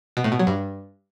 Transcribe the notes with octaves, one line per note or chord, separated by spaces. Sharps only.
B2
A2
B2
F#3
G2